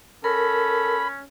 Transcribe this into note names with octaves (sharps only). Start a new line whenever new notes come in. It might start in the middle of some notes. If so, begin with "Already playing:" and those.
C#4 A4 A#4 B5